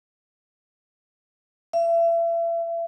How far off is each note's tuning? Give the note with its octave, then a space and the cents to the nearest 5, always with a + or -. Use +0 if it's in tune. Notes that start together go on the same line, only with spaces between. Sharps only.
E5 +35